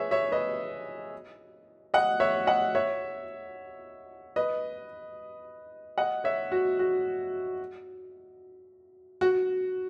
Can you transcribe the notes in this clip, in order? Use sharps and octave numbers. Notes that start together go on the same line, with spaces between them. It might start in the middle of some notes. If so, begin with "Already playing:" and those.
Already playing: G#4 B4 C#5 E5
C#5 E5
B4 D#5
D#5 F#5
C#5 E5
D#5 F#5
C#5 E5
B4 D#5
D#5 F#5
C#5 E5
F#4
F#4
F#4